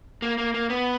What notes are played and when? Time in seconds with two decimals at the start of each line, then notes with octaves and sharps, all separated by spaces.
0.22 A#3
0.38 A#3
0.54 A#3
0.70 B3